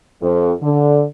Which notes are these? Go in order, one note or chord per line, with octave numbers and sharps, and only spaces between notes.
F2
D3